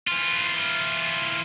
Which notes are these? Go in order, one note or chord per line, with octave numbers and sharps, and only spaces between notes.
E3 F4